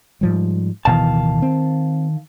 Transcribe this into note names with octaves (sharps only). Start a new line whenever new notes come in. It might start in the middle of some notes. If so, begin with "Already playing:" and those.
G#2 F3 G3
D1 B2 D#3 E3 F5 A5
C4